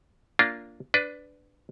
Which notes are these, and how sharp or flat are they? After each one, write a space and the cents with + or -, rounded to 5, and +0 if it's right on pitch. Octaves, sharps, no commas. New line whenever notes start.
A#3 -10 D4 -20 F4 -10
D4 +0 B4 +15 D5 +0